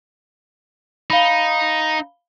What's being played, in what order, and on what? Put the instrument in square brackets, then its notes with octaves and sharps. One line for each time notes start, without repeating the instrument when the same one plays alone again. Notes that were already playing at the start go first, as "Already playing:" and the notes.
[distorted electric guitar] D#4 [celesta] F5 B5